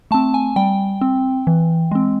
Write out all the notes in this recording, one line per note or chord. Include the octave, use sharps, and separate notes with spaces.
A3 C4 A5
G#5
G3 G5
C4
E3
G#3 C4